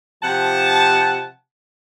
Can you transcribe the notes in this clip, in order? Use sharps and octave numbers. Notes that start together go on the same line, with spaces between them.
C3 F3 F#5 A5